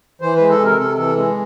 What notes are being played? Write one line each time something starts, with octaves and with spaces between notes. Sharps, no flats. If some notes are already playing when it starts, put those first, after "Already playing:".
E3 C5
G#3 B4
A4
C3
A#4
C3 A4
E3 A4
G#3